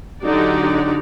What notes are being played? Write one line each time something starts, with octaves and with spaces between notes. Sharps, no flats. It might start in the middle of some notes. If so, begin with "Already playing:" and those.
D3 F#3 D#4 F#4 G4 D5